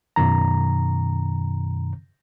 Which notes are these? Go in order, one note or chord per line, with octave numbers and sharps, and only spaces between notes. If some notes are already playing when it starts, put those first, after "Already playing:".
F#2 B2 D#3 A#5